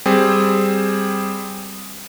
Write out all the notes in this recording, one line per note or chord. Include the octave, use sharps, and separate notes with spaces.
G3 C4 G#4